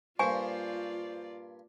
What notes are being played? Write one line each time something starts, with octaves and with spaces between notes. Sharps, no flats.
G2 A#2 F4 C5 D5 G#5 C#6